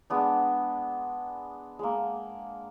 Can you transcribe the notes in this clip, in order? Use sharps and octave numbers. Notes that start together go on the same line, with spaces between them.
G#3 B3 D4
G#3 A#3